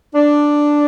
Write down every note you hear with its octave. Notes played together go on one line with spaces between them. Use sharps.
D4